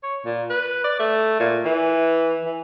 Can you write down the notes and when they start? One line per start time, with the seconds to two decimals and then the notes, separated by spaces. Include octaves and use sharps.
0.03 C#5
0.25 A#2
0.50 B4
0.84 D5
0.99 A3
1.40 A#2
1.65 E3
2.45 E3